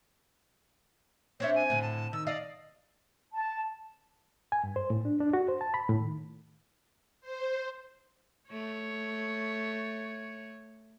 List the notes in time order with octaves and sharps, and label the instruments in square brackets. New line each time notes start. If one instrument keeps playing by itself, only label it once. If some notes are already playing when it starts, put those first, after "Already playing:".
[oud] C4 D4 E5 [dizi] C#5
[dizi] G#5
[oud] A2 D3
[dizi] A5
[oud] D#3 [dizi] E6
[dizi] D5 [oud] D#5 F5
[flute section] A5
[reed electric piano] G#5
G2
C5
A2
D4
D4
F#4
C5
A5
B5
A2
D#3
[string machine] C5
[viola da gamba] A3 C#5